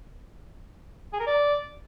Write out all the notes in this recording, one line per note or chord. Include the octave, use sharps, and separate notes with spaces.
G#4
A#4
D5